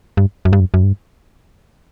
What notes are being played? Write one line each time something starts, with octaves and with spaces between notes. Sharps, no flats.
G2
F#2
G2
F#2
F#2
G2